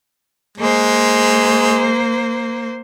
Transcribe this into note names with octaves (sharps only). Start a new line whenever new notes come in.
G#3 A#3 C5